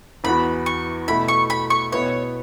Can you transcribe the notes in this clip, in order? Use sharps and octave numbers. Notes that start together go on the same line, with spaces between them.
E2 E3 B3 F#4 B5
C#6
B2 A3 E4 B5
C#6
B5
C#6
B2 B3 E4 B4 C#5